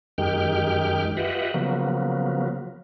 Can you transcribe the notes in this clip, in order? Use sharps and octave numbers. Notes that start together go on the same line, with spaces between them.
F#2 D#3 G#3 G4 G5 F6
F4 G4 B4 D#5 E5 F#5
C#3 F3 F#3 A#3 B3